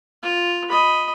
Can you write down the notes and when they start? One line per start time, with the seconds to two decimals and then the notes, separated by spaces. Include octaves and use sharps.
0.23 F4
0.69 D#5 B5